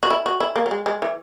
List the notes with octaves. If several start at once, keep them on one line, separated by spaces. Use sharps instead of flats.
F#4
E4
F#4
E4
A#3
F#3
G#3
G#3
E3